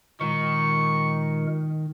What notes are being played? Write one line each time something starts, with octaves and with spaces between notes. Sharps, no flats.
A#2 D#3 G#3 A#4 C#6